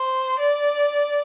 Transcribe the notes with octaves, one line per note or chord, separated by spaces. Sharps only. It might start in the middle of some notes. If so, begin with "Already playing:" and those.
Already playing: C5
D5